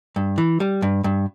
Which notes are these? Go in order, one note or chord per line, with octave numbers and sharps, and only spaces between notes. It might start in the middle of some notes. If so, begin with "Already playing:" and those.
G2
E3
G3
G2
G2